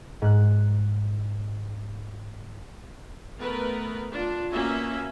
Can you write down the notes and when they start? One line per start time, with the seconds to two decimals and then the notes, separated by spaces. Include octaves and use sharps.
0.22 G#2 F#6
3.38 A3 B3 A#4 B4
4.12 D4 F4
4.52 A#3 B3 C#4 F#4 E5